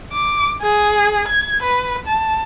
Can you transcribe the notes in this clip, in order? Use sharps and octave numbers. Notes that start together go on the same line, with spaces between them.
D6
G#4
G#6
B4
A5